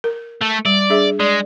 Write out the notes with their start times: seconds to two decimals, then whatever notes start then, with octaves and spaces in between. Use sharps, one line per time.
0.04 A#4
0.42 A3
0.65 G3 D5
0.90 D4 G#4 E5
1.20 G#3 D5